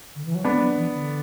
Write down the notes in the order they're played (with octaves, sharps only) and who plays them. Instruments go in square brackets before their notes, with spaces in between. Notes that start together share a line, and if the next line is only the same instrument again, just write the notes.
[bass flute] D3
E3
F#3
[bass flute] G#3 [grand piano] B3 D4
[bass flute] F#3
E3
D3